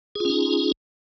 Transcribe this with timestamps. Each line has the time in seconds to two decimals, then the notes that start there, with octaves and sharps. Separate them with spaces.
0.15 G#4
0.20 F4
0.25 C#4
0.30 D#4